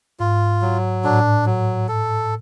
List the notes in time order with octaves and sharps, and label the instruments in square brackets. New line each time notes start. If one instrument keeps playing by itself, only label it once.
[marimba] G#2 [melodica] F4
[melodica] F#3
[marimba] A2 [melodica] D4
[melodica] F#3
A4